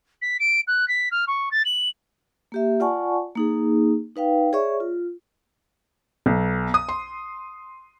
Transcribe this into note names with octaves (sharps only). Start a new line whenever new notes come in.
B6
D7
F#6
B6
F6
C#6
A6
F#7
A#3 G4 E5
F4 D5 F#5 G#5 A5 C#6
A#3 D#4 G#4
D#4 B4 F5 G5
G#4 C#5 D5 E5 C#6
F4
B1
D#6
C6